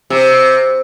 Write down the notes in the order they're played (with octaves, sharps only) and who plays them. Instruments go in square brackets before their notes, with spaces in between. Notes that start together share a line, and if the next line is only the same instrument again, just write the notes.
[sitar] C3